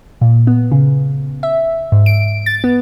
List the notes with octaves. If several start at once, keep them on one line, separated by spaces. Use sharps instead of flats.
A#2
B3
C#3
E5
G#2
D7
A6
B3